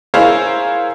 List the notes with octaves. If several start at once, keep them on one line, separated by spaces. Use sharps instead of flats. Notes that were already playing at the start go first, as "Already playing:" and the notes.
E4 G#4 A#4 C5 C#5 F5